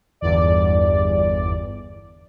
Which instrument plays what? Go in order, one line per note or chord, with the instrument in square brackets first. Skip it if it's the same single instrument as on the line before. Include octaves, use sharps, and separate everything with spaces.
[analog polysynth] G1 E2 D5